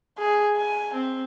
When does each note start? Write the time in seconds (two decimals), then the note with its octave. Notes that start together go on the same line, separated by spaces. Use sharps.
0.18 G#4
0.56 G#5
0.94 C4